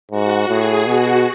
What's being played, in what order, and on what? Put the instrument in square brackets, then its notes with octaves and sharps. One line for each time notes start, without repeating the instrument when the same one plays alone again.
[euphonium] G#2 [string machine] F#4
[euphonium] A2 [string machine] G#4
[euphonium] B2 [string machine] F#4